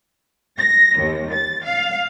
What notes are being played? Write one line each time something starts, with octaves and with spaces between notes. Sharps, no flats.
A#6
D#2
A6
F5